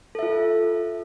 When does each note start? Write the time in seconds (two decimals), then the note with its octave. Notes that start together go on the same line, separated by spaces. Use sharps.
0.15 A4
0.19 E5
0.23 F4